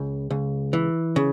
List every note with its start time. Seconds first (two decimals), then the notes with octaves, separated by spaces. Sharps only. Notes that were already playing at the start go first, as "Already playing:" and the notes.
Already playing: C#2
0.30 C#2
0.73 E3
1.16 C#3